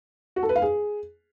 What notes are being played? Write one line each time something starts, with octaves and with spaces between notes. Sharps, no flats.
F#4
A4
B4
F5
G#4